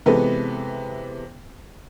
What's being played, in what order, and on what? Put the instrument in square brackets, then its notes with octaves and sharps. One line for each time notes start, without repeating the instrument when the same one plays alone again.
[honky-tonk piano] C3 E3 G#3 B3 A4 B4